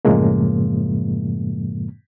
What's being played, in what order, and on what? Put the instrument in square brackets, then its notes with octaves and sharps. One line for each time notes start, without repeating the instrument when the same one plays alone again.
[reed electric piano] F#2 A2 C#3 F3 G#3 A#3